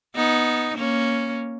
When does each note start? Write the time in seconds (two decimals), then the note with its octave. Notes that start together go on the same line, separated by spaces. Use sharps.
0.16 B3 D#4
0.77 A#3 C#4